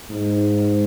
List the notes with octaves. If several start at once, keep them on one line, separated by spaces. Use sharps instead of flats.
G#2